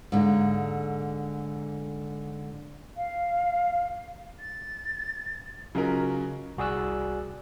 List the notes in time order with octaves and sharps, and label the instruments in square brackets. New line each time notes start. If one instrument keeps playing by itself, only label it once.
[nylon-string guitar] G#2 D3 A#3
[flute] F5
A6
[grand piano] C#3 F#3 C#4 D#4 F4 A#4
[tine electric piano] C2 F#4 G#4 D5 E6 F#6